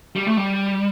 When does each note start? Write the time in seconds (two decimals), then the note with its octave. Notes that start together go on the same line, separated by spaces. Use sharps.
0.16 G3
0.27 A3
0.37 G3